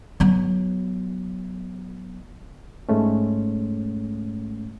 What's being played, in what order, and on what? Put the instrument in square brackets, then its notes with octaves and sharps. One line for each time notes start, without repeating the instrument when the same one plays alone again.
[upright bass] F#3 B3
[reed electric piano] G#2 G#3 A3 C#4